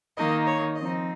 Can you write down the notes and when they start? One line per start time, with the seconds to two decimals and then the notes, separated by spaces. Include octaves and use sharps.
0.17 D#3 A#3 D#4 D#5
0.47 C#5
0.75 F3 C4 D#4 D#5